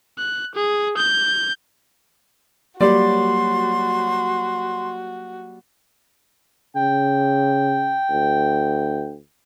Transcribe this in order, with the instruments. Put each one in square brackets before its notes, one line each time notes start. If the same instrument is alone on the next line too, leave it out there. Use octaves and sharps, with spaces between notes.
[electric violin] F#6
G#4
G6
[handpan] F#3 A#3 [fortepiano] G3 D5 [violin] F#4 [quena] C6
[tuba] C#3 [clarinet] G5
[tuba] D2